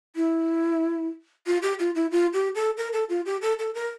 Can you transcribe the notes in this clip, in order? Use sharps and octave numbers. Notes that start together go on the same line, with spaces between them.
E4
F4
G4
F4
E4
F4
G4
A4
A#4
A4
F4
G4
A4
A4
A#4